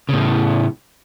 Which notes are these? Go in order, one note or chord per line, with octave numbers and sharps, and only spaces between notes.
A2 C#3